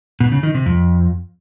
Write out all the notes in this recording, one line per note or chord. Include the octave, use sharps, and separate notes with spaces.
B2
C#3
D#3
C3
F2